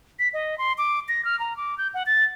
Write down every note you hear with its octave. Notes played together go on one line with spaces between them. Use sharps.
B6
D#5
C6
D6
A#6
F6
A#5
D6
G6
F#5
A6